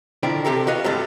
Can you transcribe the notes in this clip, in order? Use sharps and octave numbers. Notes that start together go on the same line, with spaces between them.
D3 D#3 F3 E4 G5
C3 G4 A4 A#4
F#4 B4 D#5 F5
G2 C3 G#3 A3